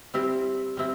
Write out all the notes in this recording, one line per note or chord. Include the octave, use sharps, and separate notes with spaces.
G3 C4 E4 G4
G3 C4 E4